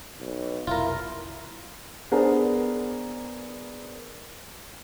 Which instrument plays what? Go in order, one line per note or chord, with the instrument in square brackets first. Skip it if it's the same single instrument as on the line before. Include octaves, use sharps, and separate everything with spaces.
[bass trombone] B1
[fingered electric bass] F1 B1 [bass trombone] E4 [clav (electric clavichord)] F4 A#4
[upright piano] B3 D4 G#4 A#4 C5